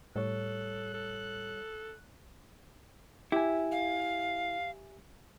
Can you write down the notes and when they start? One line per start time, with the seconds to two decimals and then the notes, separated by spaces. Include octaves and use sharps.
0.16 A2 G3 A4 C#5 F#6
0.94 A4
3.32 E4 G4 E5 G#5
3.72 F5